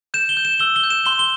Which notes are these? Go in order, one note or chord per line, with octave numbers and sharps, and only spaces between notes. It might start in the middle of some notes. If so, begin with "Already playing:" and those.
G6 E7
G7
G6
E7
E6 G7
G7
G6
E7
C6 G7
G7